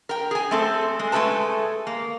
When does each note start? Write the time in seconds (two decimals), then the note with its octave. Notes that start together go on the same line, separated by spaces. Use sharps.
0.09 A#4 G5
0.31 G#4 G#5
0.51 A3 C4 A4
0.99 G#3
1.12 G#3 A3 E4 A4 B4 A5
1.87 A#3